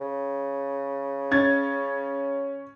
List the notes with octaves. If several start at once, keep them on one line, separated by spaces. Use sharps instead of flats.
C#3
C#4 G#6 A6